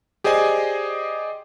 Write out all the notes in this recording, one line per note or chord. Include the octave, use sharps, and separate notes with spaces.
G4 G#4 C5 D5 D#5 G#5